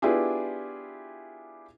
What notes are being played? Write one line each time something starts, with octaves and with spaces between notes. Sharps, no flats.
B3 D4 E4 F4 G4 G#4